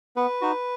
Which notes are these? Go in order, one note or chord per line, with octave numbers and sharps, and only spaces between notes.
B3 B4
D#4 F#4